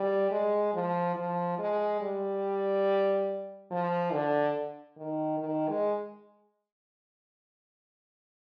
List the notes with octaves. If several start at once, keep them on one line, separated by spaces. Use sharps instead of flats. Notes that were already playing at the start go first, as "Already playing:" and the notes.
Already playing: G3
G#3
F3
F3
G#3
G3
F3
D3
D#3
D#3
G#3